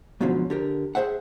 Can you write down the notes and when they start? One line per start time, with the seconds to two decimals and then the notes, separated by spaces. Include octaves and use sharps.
0.21 G#2 B2 D3 F3 F#3 C#4
0.50 D3 G4 A#4
0.95 G#4 A4 C5 E5 F#5